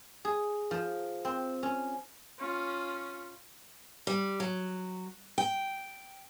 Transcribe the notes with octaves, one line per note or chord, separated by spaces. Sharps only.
G#4
F3
C4
C#4
C#4 F4
G3
F#3
G5